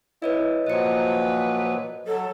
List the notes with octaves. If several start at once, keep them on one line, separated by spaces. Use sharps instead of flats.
E4 B4 C#5 D#5
A#2 F3 F#3 B4 D#5 C#7
F#3 A4